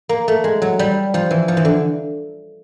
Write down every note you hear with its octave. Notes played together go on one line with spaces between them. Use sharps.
A#3
A3
G#3
F#3
G3
F3
E3
F3
E3
D3